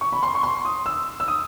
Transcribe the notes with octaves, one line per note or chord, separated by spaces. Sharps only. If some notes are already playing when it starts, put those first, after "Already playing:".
C#6
B5
C6
C#6
C6
D#6
E6
E6
D#6